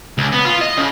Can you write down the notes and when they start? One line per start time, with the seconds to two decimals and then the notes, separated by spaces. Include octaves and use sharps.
0.18 C#2
0.32 B3
0.46 F4
0.61 D#5
0.77 C#3